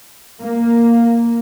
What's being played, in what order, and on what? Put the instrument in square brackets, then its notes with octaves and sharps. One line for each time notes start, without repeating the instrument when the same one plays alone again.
[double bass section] A#3